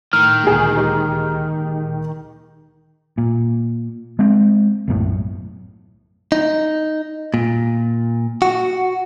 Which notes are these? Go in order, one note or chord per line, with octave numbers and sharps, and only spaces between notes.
A2 D#3 F6
D2 A#2 G#3 G#4
G#3 D#4 G4
A#2
G#3 C4
B1 F#2 A2
D#4
A#2
F#4